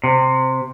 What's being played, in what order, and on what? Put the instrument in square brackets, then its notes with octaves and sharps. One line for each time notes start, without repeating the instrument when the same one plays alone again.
[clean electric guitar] C3